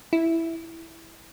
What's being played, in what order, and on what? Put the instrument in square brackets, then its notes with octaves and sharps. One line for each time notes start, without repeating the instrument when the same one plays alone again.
[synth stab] E4